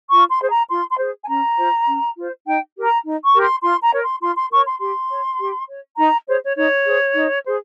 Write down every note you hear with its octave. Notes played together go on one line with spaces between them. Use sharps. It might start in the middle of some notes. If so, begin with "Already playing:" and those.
F4 C#6
C6
G#4 C5
A#5
F4 C6
C6
G#4 C5
G#5
C#4 A#5
F4 C5
C#4
F4 C5
D#4 G5
G4 A#4
A#5
D#4
C#6
G4 A#4
C6
F4 C6
A#5
A#4 C#5
C6
F4 C6
C6
A#4 C#5 C#6
C6
G4 C6
C#5
G4
C#5
D#4 A#5
G#4 C5 C#5
C#5
D#4 C#5
G#4 C5
D#4
G#4 C5